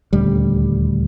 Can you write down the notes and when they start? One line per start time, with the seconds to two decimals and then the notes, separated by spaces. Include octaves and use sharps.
0.13 D#1 D2 G3